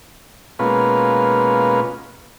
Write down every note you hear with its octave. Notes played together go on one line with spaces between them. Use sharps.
B2 G#3 A#3 C#4 F4 B4